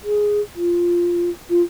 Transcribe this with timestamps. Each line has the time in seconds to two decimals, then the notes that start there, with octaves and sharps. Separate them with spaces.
0.04 G#4
0.56 F4
1.50 F4